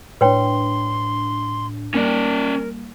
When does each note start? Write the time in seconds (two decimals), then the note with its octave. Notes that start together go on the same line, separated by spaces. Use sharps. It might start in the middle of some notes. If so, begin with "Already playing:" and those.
0.21 A2 D4 B4 C#5 G5 C6
1.94 G3 A#3 C#4 A#4 D5